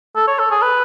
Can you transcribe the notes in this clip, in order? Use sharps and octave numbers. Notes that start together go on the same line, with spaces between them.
A4
C#5
A4
G#4
B4